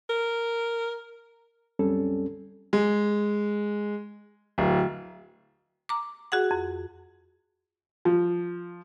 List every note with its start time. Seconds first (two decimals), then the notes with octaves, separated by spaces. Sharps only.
0.09 A#4
1.79 C2 F#2 G3 C4 C#4 A4
2.73 G#3
4.58 D1
5.89 A#5 D6
6.32 F#4 G#4 F#5
6.51 F2
8.05 F3